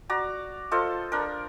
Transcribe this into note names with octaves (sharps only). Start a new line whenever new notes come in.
F#4 D5 A#5
F4 A4 C5 D#5
D4 A#4